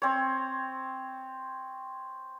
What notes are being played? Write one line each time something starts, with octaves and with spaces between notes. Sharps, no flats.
C4 C#5